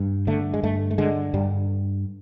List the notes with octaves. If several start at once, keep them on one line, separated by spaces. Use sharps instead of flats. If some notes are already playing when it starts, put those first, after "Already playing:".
Already playing: G2
D3 A3
G#3
G2 A3
A3
D3 G#3
G2 G3